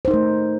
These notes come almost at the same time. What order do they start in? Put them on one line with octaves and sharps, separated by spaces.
C5 D#4 A#4 A3